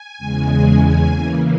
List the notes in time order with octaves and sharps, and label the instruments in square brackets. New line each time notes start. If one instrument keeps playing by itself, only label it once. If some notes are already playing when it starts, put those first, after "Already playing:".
Already playing: [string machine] G#5
E2 C#3 G#3
C#3 E3 A#3